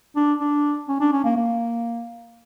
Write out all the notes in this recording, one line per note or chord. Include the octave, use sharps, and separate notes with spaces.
D4
D4
C#4
D4
C#4
A#3
A#3